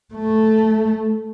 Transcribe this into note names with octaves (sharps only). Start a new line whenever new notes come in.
A3